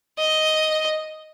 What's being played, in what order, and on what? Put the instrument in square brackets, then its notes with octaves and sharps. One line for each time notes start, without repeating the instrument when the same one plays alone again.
[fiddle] D#5